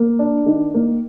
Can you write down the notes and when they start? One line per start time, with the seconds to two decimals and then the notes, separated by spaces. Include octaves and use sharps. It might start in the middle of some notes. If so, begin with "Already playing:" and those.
Already playing: A#3
0.19 D4
0.46 D#3
0.74 A#3